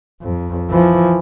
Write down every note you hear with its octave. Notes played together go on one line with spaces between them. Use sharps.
F2
E3 F3